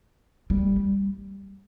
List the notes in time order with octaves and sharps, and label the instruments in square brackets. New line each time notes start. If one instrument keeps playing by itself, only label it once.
[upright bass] G3